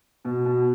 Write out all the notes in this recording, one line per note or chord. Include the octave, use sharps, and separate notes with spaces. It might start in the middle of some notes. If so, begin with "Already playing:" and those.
B2
B2